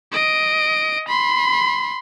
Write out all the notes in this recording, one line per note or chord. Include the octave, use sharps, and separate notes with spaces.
D#5 D7
B5 C6